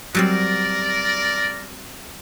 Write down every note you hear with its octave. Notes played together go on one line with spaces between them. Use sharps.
F#3 G3 C4 A#4 D5